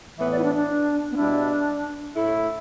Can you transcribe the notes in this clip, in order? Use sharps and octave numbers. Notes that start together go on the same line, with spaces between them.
A2 E3 B3 E5
D5
E4
D4
D4
B3
B2 G3 D4 E4
A2 A3 E4